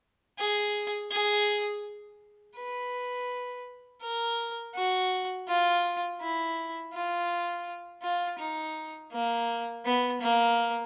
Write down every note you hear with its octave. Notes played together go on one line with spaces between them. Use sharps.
G#4
G#4
B4
A#4
F#4
F4
E4
F4
F4
D#4
A#3
B3
A#3